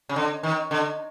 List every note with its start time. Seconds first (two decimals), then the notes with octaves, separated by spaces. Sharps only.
0.09 C#3
0.16 D3
0.43 D#3
0.71 D3